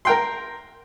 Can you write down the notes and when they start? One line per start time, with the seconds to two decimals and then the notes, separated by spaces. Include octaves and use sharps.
0.05 A#4 G5 C6